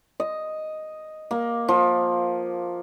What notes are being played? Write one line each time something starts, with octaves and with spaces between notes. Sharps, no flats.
D#5
A#3
F3